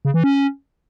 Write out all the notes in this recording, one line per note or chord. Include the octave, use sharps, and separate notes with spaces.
C#3
E3
C#4